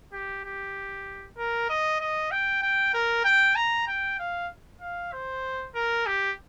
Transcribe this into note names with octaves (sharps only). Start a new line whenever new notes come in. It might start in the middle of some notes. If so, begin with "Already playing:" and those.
G4
G4
A#4
D#5
D#5
G5
G5
A#4
G5
A#5
G5
F5
F5
C5
A#4
G4